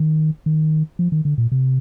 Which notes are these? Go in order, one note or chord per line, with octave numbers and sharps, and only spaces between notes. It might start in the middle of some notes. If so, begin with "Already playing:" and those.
Already playing: D#3
D#3
F3
D#3
D3
A#2
C3